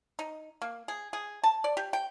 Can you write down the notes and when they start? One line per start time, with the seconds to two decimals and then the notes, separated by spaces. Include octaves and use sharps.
0.19 D#4
0.62 A#3
0.88 G#4
1.13 G#4
1.44 A5
1.64 D5
1.77 G4
1.93 G5